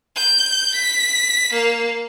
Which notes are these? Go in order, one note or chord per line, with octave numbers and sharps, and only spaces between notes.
G6
B6
A#3